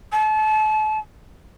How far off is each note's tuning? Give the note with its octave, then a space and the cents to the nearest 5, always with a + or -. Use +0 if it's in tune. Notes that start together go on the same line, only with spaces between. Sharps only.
A5 -35